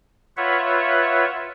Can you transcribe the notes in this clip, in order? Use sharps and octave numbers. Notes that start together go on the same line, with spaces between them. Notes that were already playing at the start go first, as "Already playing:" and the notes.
F4 B4 C#5 E5 F#5